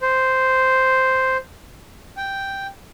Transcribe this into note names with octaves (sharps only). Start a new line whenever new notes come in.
C5
G5